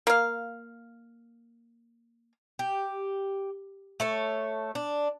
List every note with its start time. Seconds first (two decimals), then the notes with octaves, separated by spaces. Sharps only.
0.07 A#3 F5
2.59 G4
4.00 A3 A4 C#5
4.75 D4